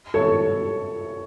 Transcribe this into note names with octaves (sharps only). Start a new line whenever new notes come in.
A4 C#5